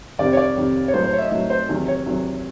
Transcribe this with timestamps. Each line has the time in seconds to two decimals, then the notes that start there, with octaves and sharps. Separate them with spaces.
0.19 F2 C3 D#3 G3 D5
0.33 C#5
0.37 D5
0.57 F2 C3 D#3 G3
0.88 C#5
0.94 A2 F#3 C5
1.04 C5
1.13 C#5
1.18 E5
1.22 D#5
1.31 A2 F#3 E5
1.50 C5
1.69 E2 C3 D#3 F#3
1.88 C#5
2.06 E2 C3 D#3 F#3